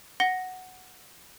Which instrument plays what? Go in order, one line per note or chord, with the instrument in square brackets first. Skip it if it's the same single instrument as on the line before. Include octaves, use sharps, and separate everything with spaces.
[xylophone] F#5 A#6 G7